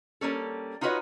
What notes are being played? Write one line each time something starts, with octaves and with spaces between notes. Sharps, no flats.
G3 A#3 C#4 A4
D#4 F4 F#4 B4 C#5 D#5